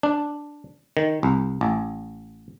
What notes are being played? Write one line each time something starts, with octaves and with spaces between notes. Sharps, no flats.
D4
D#3
C2
A1